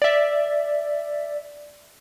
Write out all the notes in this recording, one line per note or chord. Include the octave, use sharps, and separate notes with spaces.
D5 E5